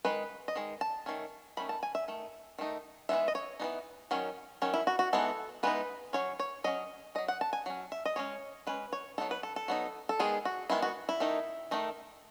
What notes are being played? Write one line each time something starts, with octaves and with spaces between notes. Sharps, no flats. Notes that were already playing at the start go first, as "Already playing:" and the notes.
D#3 G#3 D#4 B4
D#5
D#3 G#3
A5
D#3 A3 C#4
D#3 A3 C#4 B5
A5
G#5
E5
D#3 A3
D#3 A3 D#4
E3 G#3 B3 D#4 E5
D#5
C#5
E3 G#3 B3 D#4
D#3 F#3 C#4
D#3 F#3 C#4
E4
F#4
F#4
E3 G#3 B3 D#4 A4
E3 G#3 B3 D#4 B4
F#3 C#4 C#5
C#5
F#3 C#4 D#5
F#3 C#4 D#5
F#5
A5
G#5
F#3 C#4
E5
D#5
G#3 C#4 C#5
G#3 C#4 B4
C#5
F#3 B3 D#4 A4
B4
A4
A4
F#3 B3 D#4
A4
D#3 G#3 B3 G#4
F#4
D#3 G#3 B3 E4
F#4
E4
D#3 A3 D#4
D#3 A3 D#4